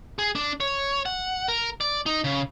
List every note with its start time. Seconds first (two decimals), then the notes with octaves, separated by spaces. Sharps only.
0.19 G#4
0.35 D4
0.60 C#5
1.06 F#5
1.48 A#4
1.81 D5
2.06 D#4
2.24 C#3